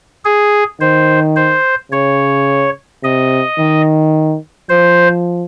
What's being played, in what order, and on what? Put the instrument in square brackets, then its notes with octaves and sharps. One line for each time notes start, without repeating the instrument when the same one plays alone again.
[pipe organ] G#4
[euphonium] D#3 [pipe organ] C5
[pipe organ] C5
[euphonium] C#3 [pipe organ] C#5
[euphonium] C3 [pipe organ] D#5
[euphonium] D#3
[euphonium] F3 [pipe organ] C5